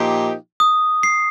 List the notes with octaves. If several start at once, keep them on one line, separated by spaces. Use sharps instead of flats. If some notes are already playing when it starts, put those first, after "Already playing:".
Already playing: A#2 F3 A#3 D#4 G4
D#6
C7